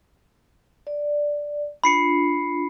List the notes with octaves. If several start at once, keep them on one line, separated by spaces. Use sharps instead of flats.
D5
D4 F4 B5 C7 C#7